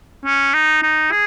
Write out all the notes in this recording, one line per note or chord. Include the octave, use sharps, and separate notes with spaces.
C#4
D#4
D#4
G#4